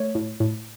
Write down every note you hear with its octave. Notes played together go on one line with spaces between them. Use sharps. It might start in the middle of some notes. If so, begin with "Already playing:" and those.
Already playing: A3 C#5
A2
A2